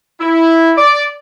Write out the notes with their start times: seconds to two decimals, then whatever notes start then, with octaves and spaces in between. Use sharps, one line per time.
0.20 E4
0.77 D5